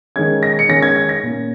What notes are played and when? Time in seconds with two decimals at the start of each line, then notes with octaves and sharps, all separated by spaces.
0.16 D#3 G#3 C#4 G#6
0.43 A#6
0.59 C#7
0.69 D#3 G#3 C#4 A#6
0.82 G#6
0.96 G#6
1.09 A#6
1.23 A#2 A#3 C#4